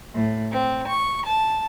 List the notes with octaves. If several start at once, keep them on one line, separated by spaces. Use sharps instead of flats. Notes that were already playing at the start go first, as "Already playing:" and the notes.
A2
C4
C#6
A5